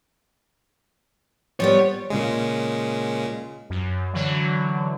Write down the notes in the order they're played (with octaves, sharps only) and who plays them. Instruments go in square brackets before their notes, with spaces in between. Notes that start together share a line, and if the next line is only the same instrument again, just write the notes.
[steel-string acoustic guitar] F3 G3 B3 [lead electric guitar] C#5
[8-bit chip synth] A#2 C#3 G#3
[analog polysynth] F#2
D3 E3 F#3